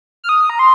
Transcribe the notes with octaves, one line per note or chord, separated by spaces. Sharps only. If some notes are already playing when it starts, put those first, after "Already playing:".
F6
D#6
A#5
C6